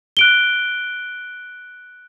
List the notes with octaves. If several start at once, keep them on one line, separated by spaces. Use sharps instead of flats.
F#6 D7 G7